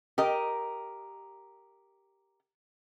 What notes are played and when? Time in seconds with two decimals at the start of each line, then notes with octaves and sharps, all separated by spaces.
0.18 G4 A#4 D#5